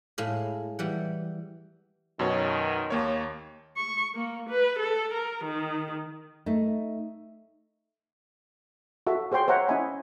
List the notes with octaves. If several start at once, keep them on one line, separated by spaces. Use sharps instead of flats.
A2 G#3 F5
E3 G3 F#5
F#2 B2 D#3 C#5
D#2 A#3 C#5
C#6
A#3
B4
A4
A#4
D#3
A3 D#4
F#4 A4 E5
G#4 C5 C#5 G5 C6
C5 C#5 E5 F#5 A#5
C#4 E4 D#5 E5 G#5 B5